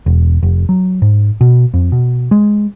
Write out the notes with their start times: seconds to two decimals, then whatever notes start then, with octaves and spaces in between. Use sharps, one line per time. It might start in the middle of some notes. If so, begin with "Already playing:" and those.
0.06 E1
0.43 F1
0.69 F#3
1.02 G#2
1.41 B2
1.74 F2
1.92 B2
2.31 G#3